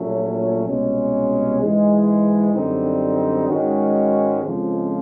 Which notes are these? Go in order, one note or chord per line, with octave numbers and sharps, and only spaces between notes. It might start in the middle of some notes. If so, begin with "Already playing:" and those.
Already playing: A#1 A#2 F#3 A3 C#4
C2 B2 G#3 C#4
G#2 E3 G#3
F#2 D3 G3 C4 D#4
G#2 D#3 G#3 C#4 F#4
F2 C#3 F3 G#3